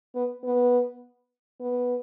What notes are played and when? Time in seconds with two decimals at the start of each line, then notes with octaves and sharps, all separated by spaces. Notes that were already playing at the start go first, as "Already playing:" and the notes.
0.15 B3
0.44 B3
1.60 B3